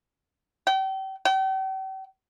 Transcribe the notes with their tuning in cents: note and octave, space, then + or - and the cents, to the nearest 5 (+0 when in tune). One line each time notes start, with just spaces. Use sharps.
G5 -35
G5 -40